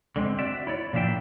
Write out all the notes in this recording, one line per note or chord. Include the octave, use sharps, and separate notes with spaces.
D3 G#3 C4
F#4 D5 E5
E4 C#5 D5
A#2 F3 D4 E5 G5